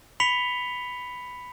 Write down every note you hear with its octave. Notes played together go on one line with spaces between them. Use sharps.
B5 B6 C#7 F7 G7